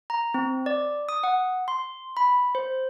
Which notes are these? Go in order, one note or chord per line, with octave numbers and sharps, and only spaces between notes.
A#5
C4
D5
D#6
F#5
C6
B5
C5